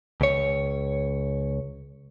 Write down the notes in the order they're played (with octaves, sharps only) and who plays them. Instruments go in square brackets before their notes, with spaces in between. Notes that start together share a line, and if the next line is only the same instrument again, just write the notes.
[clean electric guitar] C#2 C#5